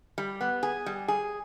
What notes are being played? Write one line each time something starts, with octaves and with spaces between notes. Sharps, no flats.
G3
B3
G#4
G3
G#4